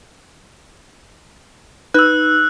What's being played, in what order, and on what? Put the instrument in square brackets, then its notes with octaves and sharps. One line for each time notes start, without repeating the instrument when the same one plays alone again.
[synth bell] D#4 B4 [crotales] E6 F#6